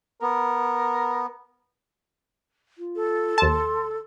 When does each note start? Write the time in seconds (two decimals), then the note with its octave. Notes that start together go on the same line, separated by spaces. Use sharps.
0.22 B3 A#4
2.78 F4
2.96 A4
3.38 D#2 A5 C6